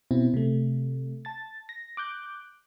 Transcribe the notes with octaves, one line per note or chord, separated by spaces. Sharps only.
B2 C4 E4
C3 A3
A5 A6
A#6
D6 F#6 G6